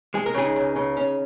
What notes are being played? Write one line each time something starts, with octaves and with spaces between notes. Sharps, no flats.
G#3 G#4
A#4
C#3 D#4 G#4
C#2
C#3
C#4